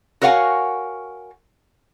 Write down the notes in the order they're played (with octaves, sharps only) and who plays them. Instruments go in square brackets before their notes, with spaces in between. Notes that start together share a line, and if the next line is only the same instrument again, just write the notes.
[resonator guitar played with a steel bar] F#4 A#4 C#5 F5 F#5 G#5